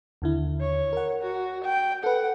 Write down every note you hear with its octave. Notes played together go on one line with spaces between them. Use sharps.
D#2 D3 E4
C#5
A#4 F#5
F#4
G5
A4 B4 F#5